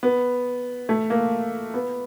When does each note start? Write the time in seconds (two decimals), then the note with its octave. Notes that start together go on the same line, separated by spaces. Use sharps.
0.03 B3
0.89 A3
1.10 A#3
1.74 B3